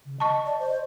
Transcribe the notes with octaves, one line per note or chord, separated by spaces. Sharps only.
C#3
D#5 A5 C#6
D5
C5